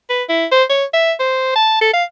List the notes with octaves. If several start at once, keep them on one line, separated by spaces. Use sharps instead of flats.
B4
E4
C5
C#5
E5
C5
A5
A4
F5